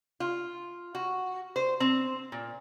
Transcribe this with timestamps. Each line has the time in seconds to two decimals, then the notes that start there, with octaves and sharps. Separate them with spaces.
0.20 F4
0.95 F#4
1.56 C5
1.80 C4
2.32 A#2